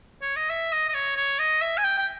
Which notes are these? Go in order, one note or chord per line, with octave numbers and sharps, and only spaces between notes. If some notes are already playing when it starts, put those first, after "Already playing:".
C#5
D#5
E5
D#5
D#5
C#5
C#5
D#5
E5
G#5
G5
G5